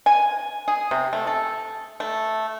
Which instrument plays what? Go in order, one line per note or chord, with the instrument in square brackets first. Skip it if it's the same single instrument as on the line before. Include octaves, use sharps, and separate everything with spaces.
[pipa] G#5
G#4
C3
A3
A4
A3